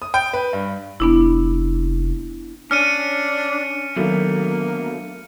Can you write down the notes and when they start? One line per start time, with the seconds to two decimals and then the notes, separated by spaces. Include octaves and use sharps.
0.02 D#6
0.14 G5
0.33 B4
0.53 G2
1.00 F1 B3 D4 E4
2.71 C#4 D4 F6 C#7 D#7
3.96 B2 D3 D#3 F#3 A3 A#3